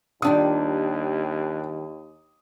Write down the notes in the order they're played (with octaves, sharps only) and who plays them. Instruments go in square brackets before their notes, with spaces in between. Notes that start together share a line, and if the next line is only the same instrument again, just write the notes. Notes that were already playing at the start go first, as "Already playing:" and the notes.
[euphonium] D#2 [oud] D#3 G3 F4 [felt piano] D4 D#6